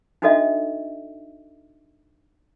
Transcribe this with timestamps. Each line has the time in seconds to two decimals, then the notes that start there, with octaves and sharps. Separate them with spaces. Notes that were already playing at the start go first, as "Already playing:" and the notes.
0.22 D4 D#4 F#4 A4 D#5 E5